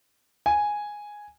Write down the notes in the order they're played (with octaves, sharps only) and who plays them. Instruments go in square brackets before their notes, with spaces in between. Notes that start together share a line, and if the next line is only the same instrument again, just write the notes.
[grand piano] G#5